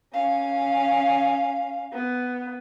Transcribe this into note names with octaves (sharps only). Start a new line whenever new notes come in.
C#4 F5
B3